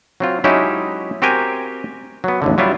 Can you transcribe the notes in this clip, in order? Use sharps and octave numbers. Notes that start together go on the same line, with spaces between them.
F#3 C4 F4
F#3 G#3 C#4 D#4 E4 G4
C4 F#4 G4 A#4 G5 G#5
F#3 B3
A1 D#2 D3
F#3 G3 E4 F4